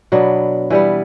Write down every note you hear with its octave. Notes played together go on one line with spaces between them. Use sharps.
B2 F#3 B3 D4
E3 G3 B3